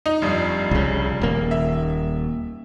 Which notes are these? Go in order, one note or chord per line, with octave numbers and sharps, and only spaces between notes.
D#4
F1 G2
C2 C#3
D#1 A#3
E5